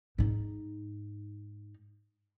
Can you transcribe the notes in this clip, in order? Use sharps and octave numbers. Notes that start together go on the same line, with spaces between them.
G#2 D#4